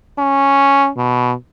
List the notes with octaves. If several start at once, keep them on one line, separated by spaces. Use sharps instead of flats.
C#4
B2